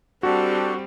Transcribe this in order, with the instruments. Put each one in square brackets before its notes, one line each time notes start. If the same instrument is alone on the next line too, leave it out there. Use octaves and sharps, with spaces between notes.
[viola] G3 C4 [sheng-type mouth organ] D4 G4 A4 [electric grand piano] F#4